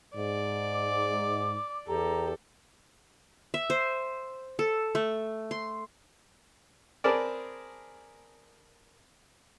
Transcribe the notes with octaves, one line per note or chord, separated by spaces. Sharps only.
G#2 D5
D6
E2 G4 A4 A#5
E5
C5
A4
A3
C6
C4 G#4 A#4 B4 D5 A5